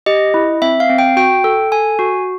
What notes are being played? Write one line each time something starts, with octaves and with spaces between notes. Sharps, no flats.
G4 D#5
E4
C4 E5
F5
C4
G5
F#4 G5
A4
A4 G#5
F#4